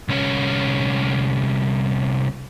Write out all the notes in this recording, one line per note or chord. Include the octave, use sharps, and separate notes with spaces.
C2 C#4